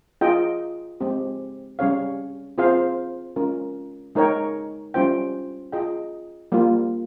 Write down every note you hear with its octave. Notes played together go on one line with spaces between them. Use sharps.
F4 G#4 D#5 G5
G#3 C4 G4
G3 C#4 G#4 C#5 F5
C4 F4 G#4 C5 F5
G#3 C#4 F4 A#4
G#3 D#4 A#4 C#5 G5
G3 C#4 F4 C5 G5
F4 G#4 D#5 G5
G3 A#3 F4